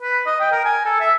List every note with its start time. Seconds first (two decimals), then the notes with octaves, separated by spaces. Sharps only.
0.02 B4
0.26 D#5
0.40 G5
0.52 A#4
0.65 G#5
0.86 A4
1.00 E5